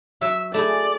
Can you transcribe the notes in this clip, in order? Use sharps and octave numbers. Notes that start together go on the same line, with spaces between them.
F#3 E5
A3 E4 G#4 D5